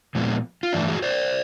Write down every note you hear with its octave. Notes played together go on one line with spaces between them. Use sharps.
A#2 F3 G#3 B3
F4
G2 E3 A3 D4 E4
F#4 G#4
C5 D5